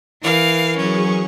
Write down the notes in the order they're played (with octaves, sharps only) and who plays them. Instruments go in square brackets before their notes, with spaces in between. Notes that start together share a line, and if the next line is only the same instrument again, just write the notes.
[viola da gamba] E3 [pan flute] A#4 [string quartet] F5
[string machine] F#3 G#4 C#6 [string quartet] C#4